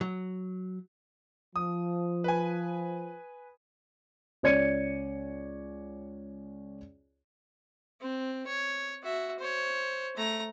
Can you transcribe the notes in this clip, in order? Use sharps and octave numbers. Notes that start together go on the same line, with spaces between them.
F#3
F3 D#6
B4 G#5
C#2 C#5 D5 G#6 C#7 D#7
C4
C#5
F#4 E5
C5 C#5
A3 A#5